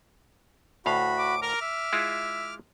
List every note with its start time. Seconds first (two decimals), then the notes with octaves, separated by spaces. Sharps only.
0.86 D2 A2 F#4 F5 B5
1.18 D6
1.42 A#4 D6 F6
1.62 E5
1.93 G#3 E4 F4